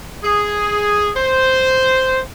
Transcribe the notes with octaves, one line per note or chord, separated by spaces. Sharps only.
G#4
C5